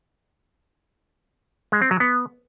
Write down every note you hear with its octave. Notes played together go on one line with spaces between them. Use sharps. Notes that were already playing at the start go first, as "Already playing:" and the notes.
G#3
C4
F#3
B3